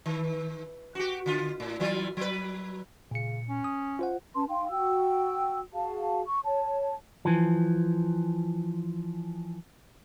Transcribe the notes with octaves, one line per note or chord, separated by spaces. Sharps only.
D#3
F#4 G4
D3 F4
A2
E3 F#3 F4
F#3 B4
A#2 C#3 C#7
C#4
D#6
F4 C5 F#5
C#4 B4 A5 C6
D#4 F5 G5 C6
F#4 G5 E6
F#4 G#4 F5 A5
C#6
C#5 A5
E3 F3